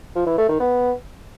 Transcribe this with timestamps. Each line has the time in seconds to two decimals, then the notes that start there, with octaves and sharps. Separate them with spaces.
0.16 F3
0.27 E3
0.38 A3
0.49 D#3
0.60 B3